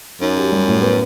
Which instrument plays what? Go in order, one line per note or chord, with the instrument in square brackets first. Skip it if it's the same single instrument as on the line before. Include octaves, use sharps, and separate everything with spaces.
[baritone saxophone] F#2 [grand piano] D#4
[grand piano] G4
G3
A2
B3